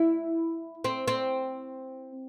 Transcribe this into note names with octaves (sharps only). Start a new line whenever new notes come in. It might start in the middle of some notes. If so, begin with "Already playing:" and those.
Already playing: E4
C4
C4